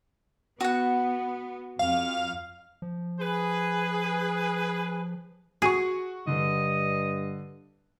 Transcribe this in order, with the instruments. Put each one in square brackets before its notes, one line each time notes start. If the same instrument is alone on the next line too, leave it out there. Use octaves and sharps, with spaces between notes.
[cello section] B3 [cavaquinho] F#4 F#5
[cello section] F2 [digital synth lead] F5
[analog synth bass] F3
[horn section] G#4 B4
[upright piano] F#4 C#6 [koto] G#4
[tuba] G2 [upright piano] D3 [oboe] D#5